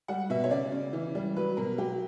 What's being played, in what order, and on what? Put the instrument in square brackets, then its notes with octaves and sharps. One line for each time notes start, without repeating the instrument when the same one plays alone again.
[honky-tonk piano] G3 F#5
B2 E5
C#5
C#3 D5
C#3
E3
G3
F#3 B4
B2 A#4
F#3 G4